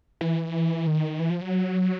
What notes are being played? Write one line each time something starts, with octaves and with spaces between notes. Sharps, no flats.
E3
D#3
E3
F3
F#3